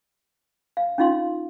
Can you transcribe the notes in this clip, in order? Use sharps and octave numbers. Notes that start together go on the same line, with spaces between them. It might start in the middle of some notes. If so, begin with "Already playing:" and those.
F5
C#4 D#4 F4 F5 C6